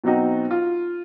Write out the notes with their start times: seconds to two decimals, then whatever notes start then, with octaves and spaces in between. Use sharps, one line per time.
0.04 B2 F#3 C4 D#4 F#4
0.51 F4